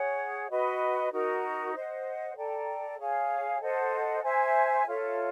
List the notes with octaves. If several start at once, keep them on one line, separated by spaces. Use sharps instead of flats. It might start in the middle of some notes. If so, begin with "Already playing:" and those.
Already playing: G#4 C#5 F#5
F#4 B4 D#5
D#4 F#4 A#4
C5 D#5 F#5
A4 D5 G5 A#5
G#4 C#5 F5 G#5
A4 C5 D#5 F#5
C5 E5 G#5
F4 A4 C#5 E5